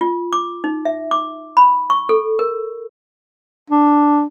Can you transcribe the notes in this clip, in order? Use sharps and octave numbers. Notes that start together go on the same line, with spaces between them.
F4
D6
D#4
E5
D6
B5
C#6
A4
A#4
D4